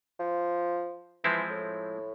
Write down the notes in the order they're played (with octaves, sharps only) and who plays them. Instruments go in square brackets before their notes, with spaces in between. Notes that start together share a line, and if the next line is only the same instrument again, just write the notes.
[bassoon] F3
[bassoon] E3 [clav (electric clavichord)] F3 G#3 C4 E4
[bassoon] A2